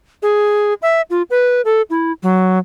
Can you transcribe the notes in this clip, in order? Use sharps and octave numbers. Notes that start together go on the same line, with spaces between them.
G#4
E5
F4
B4
A4
E4
F#3